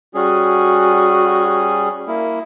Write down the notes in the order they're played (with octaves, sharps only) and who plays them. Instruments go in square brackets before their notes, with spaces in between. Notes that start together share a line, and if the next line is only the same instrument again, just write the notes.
[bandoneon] G3 C#4 G#4 [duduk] F#4
[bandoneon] A#3 E4